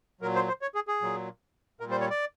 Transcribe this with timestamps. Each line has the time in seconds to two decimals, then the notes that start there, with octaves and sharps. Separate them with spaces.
0.21 A#2 F#3 A#4
0.35 C5
0.48 C5
0.62 C#5
0.75 G#4
0.88 G#4
1.01 A#2 F#3
1.80 A#2 G3 A#4
1.91 C5
2.01 C#5
2.10 D5